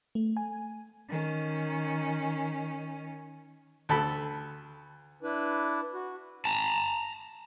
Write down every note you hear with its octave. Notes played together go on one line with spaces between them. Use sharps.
A3
G#5
D#3 C#4
D2 A4 B5
D4 E4 B4
F#4
A5 A#5